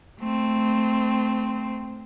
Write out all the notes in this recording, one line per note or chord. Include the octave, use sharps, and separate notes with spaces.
A3 C4